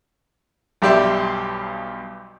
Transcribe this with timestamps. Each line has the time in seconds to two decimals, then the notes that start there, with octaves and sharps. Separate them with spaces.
0.82 B1 G2 G4 D5 E5 C6